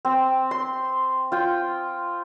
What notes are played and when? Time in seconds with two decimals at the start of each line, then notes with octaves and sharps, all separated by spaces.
0.05 C4
0.51 C6
1.32 F4 G5